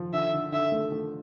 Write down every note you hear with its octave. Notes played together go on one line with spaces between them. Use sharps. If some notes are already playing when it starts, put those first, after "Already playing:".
Already playing: F3
D3 E5
D3
D3 E5
A3
A3